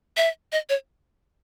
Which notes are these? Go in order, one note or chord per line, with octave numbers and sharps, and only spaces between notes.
E5
D#5
C#5